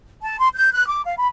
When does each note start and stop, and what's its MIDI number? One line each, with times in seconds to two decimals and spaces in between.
0.22 0.37 81
0.39 0.49 84
0.54 0.72 91
0.73 0.87 90
0.87 1.04 86
1.05 1.14 77
1.18 1.28 83